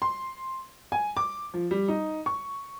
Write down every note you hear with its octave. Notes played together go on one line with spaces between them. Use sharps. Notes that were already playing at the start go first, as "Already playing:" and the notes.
C6
G#5
D6
F3
G3
D#4
C#6